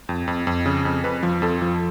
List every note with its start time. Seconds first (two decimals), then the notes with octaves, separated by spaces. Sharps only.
0.09 F2
0.27 F2
0.47 F2
0.66 C#3
0.85 F2
1.04 F2 B4
1.23 F3
1.42 F2 A4
1.62 F3